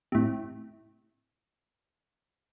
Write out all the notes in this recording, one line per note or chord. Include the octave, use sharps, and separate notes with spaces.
A2 C3